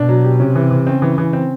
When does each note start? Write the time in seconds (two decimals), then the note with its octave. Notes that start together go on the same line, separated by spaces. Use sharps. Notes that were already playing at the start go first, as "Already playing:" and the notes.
Already playing: B2 D4
0.09 F#3
0.24 G4
0.40 C3 C#4
0.55 E3
0.70 E3
0.87 C#3 C4
1.02 E3
1.18 E3
1.33 C4